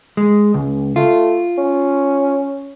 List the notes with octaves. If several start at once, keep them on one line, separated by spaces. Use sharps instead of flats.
G#3
C#2
A3 F4
C#4